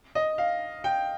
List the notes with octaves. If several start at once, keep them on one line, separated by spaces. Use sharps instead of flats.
D#5
F5
G5